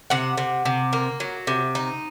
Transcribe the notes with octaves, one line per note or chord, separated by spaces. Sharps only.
C3 F#5
C3
C3
A#3
F#3
C3
D#4